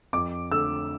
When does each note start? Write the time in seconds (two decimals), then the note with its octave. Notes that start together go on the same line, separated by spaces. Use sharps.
0.13 F2 D6
0.51 D3 A3 E6